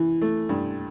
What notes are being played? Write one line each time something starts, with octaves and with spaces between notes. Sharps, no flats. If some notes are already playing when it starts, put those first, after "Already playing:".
Already playing: E3
A3
G2